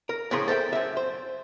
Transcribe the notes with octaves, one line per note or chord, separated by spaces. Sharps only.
A#4
A2 C#3 F3 A3 A#4 C6
A4 C5 E5 G5
F#2 E5
C5